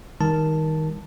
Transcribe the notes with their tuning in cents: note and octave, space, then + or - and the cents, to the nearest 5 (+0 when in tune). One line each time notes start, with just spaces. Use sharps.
D#3 +15 G3 +35 A5 +0